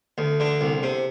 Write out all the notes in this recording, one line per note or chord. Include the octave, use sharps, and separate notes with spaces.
D2
D3
C2
C3